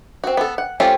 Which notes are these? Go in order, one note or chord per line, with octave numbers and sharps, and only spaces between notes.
C4 F#4
B3 A4
F#5
A3 C4 C#4 F4 G4